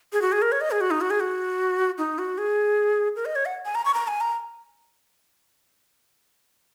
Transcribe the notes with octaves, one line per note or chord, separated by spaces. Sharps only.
G#4
F#4
G#4
A#4
C#5
D#5
G#4
F#4
D#4
F#4
G#4
F#4
D#4
F#4
G#4
A#4
D#5
C#5
F#5
G#5
A#5
C#6
A#5
G#5
A#5